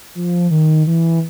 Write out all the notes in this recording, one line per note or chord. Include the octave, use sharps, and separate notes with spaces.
F3
D#3
E3